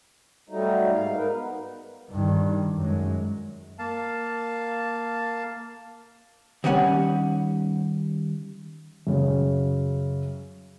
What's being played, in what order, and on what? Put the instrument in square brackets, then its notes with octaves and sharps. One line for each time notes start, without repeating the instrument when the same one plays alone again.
[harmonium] F#3 G3 A3 D#4
G#2 F5
D#4 A#4 B4
B3
[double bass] G2 D#3
F#2 G#3
[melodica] A#3 F5 A5
[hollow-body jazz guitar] D#3 G3 C#4 F#5 G#5
[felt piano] F#2 C#3